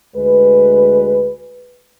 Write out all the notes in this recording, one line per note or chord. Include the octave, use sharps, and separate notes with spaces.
D2 G#3 B4